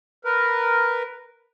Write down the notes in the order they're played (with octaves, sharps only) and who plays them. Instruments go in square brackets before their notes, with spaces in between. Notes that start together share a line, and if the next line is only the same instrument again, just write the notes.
[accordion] A#4 B4